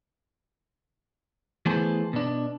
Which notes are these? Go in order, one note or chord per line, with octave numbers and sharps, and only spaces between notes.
E3 A3 B3 G#4 A4 C5
B2 D4